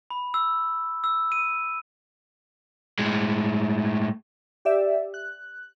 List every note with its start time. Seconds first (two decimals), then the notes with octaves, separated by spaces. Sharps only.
0.10 B5
0.34 E6
1.04 E6
1.32 D#7
2.99 A2 G#3
4.65 G4 D5 E5
5.14 F#6